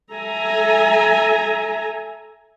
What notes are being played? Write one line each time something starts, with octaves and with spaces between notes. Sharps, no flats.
A4 E5 G#5 A#5